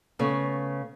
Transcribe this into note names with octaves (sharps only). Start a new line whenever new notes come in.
C#3 A3 B3